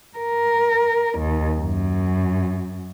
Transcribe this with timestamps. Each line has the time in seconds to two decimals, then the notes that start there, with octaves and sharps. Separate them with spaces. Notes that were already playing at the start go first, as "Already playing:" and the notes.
0.18 A#4
1.19 D#2
1.60 F#2